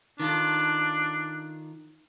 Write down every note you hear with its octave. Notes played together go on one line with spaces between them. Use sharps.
D#3 D4 F4 A4